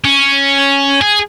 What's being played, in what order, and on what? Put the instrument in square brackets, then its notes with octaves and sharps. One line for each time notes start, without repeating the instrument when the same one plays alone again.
[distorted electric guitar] C#4
G#4